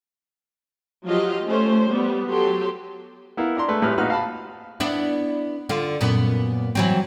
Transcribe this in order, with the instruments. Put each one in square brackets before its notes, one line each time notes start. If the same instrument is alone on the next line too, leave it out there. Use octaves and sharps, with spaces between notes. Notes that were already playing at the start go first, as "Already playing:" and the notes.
[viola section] F3 F#3 F4 G4 D#5 F5
A3 C#4 C5
G3 B3
F#3 G4 A4 C6
[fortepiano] B3 E4 A#4 F5
D4 A#5 C6
G#3 A3 B4
G#1 A2 G3 B4 F6
A#1 D#4 F#4 B4 F6
F5 A5 B5
[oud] B3 D4 E4
D3 F4
F#2 A#2 B3
E3 F#3 C4